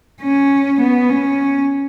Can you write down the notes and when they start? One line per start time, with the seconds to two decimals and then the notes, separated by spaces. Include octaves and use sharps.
0.22 C#4
0.81 B3
1.09 C#4